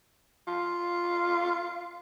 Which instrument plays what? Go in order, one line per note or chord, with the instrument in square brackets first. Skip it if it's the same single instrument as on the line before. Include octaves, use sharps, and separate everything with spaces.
[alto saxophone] F4